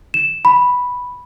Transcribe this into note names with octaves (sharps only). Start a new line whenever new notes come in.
E7
B5